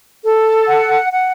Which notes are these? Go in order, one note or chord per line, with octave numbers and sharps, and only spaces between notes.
A4
F#5
F#5